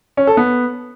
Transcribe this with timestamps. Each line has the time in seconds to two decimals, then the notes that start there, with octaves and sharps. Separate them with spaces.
0.17 C#4
0.27 A4
0.37 B3